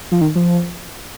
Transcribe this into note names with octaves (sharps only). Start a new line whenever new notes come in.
F3
D#3
F3